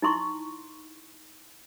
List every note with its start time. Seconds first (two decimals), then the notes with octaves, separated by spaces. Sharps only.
0.02 D#4 E4 C6 C#6